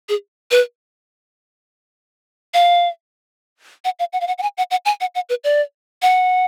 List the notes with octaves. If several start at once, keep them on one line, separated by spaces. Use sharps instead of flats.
G#4
B4
F5
F#5
F5
F#5
F5
F#5
F#5
G#5
F#5
F#5
G#5
F#5
F#5
B4
D5
F#5